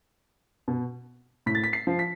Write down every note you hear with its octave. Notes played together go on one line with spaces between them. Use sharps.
B2
A2 B6
A6
B6
C7
F3
B6